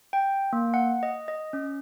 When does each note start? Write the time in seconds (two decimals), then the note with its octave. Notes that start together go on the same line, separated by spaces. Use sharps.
0.13 G5
0.53 A#3
0.74 F#5
1.03 D#5
1.28 D#5
1.53 C#4